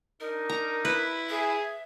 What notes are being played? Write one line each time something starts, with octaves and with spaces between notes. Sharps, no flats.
D4 D#4 A#4
A#5
E4 B4
G#4 E5